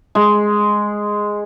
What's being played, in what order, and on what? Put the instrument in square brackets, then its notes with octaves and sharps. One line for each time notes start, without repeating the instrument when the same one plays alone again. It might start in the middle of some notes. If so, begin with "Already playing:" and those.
[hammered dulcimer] G#3